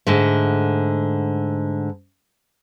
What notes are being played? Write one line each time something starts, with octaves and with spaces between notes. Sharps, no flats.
G#2 D3 A3